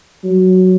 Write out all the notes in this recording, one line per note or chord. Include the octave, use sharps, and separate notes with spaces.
F#3